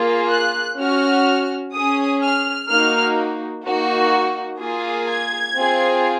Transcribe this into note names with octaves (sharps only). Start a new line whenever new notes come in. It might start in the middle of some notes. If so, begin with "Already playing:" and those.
Already playing: A#3 F4 G#4
F#6
C#4 F#4 F6
C#4 G#4 D#6
F6
A#3 D#4 F#4 F6
A#3 D#4 F#4
A#3 F4 G#4
G#6
C4 F4 G#4